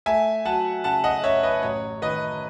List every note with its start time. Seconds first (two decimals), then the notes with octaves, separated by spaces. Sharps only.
0.06 A3 E5 G#5
0.45 F#3 F#5 A5
0.84 C#3 F#5 A5
1.04 D#5 F#5
1.24 F#2 C#5 E5
1.43 B4 D#5
1.63 A1 C#5
2.02 D#3 B4 D#5